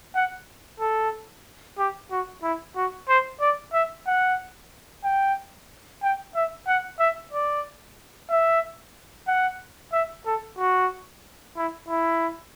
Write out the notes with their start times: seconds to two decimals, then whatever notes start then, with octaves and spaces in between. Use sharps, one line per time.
0.15 F#5
0.80 A4
1.78 G4
2.11 F#4
2.43 E4
2.76 F#4
3.09 C5
3.41 D5
3.73 E5
4.07 F#5
5.04 G5
6.03 G5
6.35 E5
6.67 F#5
6.99 E5
7.33 D5
8.30 E5
9.28 F#5
9.93 E5
10.26 A4
10.59 F#4
11.57 E4
11.88 E4